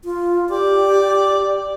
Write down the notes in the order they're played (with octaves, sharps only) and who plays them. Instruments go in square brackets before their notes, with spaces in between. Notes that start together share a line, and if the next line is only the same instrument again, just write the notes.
[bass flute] F4
[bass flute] G4 [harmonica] D5